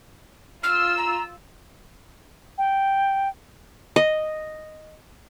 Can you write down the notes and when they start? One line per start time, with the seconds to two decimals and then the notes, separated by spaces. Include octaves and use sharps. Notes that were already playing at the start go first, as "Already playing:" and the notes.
0.63 F4 E6 F6
0.97 A#5
2.58 G5
3.96 D#5